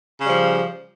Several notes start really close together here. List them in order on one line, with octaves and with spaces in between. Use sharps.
C#3 G3 F3